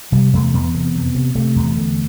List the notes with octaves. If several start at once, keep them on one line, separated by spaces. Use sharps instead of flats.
C3 G3
E2 A3
E2 B3
C3
C3
C3
C3 A3
E2
D3